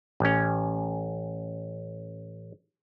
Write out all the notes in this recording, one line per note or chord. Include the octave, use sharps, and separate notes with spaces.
A1 C#4